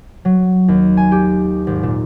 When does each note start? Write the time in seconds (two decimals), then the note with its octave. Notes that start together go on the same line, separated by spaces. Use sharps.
0.25 F#3
0.68 D#2
0.97 G#5
1.12 G4
1.67 G#1
1.83 A#2